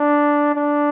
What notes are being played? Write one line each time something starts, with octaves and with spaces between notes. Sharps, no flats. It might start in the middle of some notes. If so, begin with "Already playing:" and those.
Already playing: D4
D4